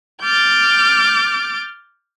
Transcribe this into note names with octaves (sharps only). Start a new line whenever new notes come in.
D6 F6 G6 A6